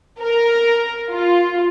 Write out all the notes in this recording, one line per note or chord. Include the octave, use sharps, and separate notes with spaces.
A#4
F4